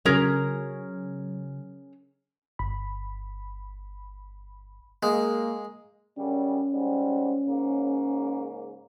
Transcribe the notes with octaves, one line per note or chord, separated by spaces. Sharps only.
C#3 F#3 C#4 G#4 A#4
G1 B5
G#3 A#3
F#2 C#3 G3 C#4
G#2 G3
G#2 C#3 A#3